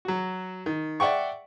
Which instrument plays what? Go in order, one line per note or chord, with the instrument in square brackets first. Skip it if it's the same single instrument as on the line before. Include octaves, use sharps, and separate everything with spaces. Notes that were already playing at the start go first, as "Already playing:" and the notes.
[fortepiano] F#3 F#4
D#3
D5 E5 F#5 G5 C#6